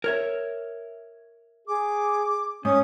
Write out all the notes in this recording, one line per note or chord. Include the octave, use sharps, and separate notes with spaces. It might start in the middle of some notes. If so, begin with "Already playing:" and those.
A#4 C#5 E5
G#4 D6
G#2 C#4 D#6